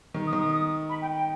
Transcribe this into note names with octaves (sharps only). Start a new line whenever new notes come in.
D#3
D#6
D#3
D#6
D#6
B5
G5
G5